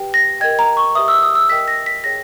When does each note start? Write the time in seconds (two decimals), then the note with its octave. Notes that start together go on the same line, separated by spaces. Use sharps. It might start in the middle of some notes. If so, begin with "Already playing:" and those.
Already playing: G4 B4 G5
0.14 A#6
0.41 A#4 D#5 G5 G#6
0.59 A#5
0.77 C#6
0.95 G4 B4 E5 D#6
1.08 E6
1.23 D#6
1.35 E6
1.49 A#4 D#5 G5 B6
1.68 A#6
1.86 B6
2.04 G#4 C#5 G5 A#6